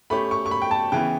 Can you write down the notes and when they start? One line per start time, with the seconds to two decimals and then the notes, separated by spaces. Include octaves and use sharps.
0.10 A3 C#4 G4 B5
0.31 C#6
0.46 C#6
0.51 B5
0.62 G5
0.71 A5
0.92 C#3 E3 B3 G5